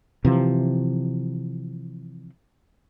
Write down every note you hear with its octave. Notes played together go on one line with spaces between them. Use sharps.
C3 E3 F3